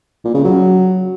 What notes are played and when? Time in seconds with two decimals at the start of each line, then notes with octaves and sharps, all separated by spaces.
0.25 A#2
0.34 C#3
0.44 F#3